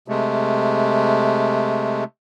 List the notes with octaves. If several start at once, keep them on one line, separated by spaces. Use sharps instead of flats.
C3 G#3 A3